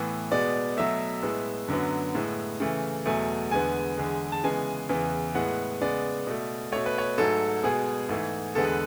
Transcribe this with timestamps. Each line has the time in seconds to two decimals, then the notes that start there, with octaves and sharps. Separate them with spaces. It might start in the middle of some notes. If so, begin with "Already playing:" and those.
Already playing: A2 E3 B3
0.31 B2 G#3 B3 D5
0.77 B2 F#3 A3 E5
1.23 A2 G#3 B3
1.68 F#2 D3 F#3 B3
2.15 A2 G#3 B3
2.60 C#3 E3 A3
3.06 E2 B2 F#3 A3 G#5
3.51 E2 D3 G#3 B3 G#5
3.98 E2 D3 G#3
4.32 A5
4.44 C#3 E3 G#3 B3 G#5
4.89 E2 C#3 E3 B3
5.35 A2 G#3 B3 F#5
5.81 C#3 G#3 B3 D5
6.27 B2 A3
6.72 B2 A3 C#5
6.86 B4
6.98 C#5
7.18 G#2 F#3 A3 A4
7.64 B2 G#3 B3 G#4
8.09 G#2 E3 A3
8.55 E2 D3 G#3 B3 A4
8.64 B4